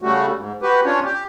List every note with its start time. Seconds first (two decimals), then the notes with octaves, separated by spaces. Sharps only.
0.02 C#3 G3 A3 F#4
0.37 G#2
0.62 F#4 G4 B4
0.85 C#4 D4 F4 C#5
1.04 G4